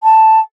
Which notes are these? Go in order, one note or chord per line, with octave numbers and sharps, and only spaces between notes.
A5